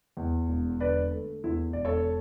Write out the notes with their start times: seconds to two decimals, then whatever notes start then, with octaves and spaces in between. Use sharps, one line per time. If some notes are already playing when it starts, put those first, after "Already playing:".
0.17 E2
0.48 E1
0.80 D3 B4 D5
1.11 A3
1.44 E2 E4
1.73 E1 D5
1.85 A4 C#5